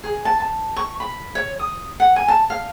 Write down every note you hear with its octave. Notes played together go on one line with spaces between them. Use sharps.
G#4
A5
A5
C#6
B5
C#5
D#6
F#5
G#5
A5
F5